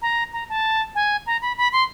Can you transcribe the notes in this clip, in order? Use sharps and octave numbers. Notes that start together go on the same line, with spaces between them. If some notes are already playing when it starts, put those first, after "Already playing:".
A#5
A#5
A5
G#5
A#5
B5
B5
C6